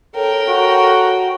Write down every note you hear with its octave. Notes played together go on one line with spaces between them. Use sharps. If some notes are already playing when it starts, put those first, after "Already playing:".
A4 A#4 C#5 G5
F#4